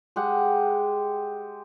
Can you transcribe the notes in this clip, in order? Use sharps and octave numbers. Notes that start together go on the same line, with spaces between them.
G#3 G4 F#5